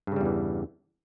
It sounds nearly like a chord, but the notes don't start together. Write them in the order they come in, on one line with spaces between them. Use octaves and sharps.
G2 C#3 G3 E2 E3